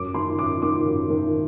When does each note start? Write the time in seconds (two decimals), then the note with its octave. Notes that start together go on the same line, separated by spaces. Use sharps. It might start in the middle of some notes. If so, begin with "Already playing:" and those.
Already playing: F#2 D6
0.14 D#3 C6
0.38 F#2 D6
0.62 D#3 D6
0.86 F#2
1.10 D#3